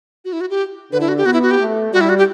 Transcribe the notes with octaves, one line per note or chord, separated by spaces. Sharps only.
F#4
E4
F#4
G4
D3 B4
E4
F#4
G4
B3 F#4
E4
F#4
G4
A3
G3 F#4
E4
F#4
G4